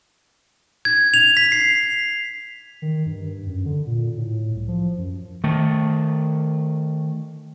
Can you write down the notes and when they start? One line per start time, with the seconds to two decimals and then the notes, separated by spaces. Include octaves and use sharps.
0.85 G#6
1.14 F7
1.37 B6
1.52 C7
2.82 D#3
3.06 G2
3.46 F#2
3.65 D3
3.87 A#2
4.17 A2
4.55 C2
4.68 F3
4.98 F#2
5.44 D#3 A3